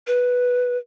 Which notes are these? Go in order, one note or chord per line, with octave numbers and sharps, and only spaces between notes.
B4